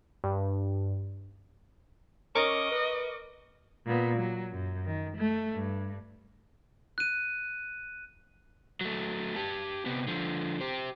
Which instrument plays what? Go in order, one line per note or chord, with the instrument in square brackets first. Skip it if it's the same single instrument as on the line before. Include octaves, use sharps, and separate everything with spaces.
[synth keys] G2
[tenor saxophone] C#4 [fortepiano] A#4 [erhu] D#5 [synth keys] C#6 D6
[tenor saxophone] B4
[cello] A#2 B3
F#3
F#2
D#3
A3
G2
[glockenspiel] F#6 D#7
[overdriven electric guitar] F#3 A3
G4 A5
C3 B3
D3 F3
G4 C5